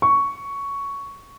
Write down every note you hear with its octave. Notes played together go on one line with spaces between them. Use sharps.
C#6